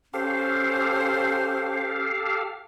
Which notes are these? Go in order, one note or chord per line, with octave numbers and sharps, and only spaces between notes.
C#4 G4 A4 C5 F5